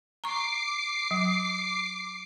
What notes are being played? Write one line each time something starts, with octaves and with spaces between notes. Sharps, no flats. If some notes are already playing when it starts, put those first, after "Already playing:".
A#5 C#6 D6 C7
F#3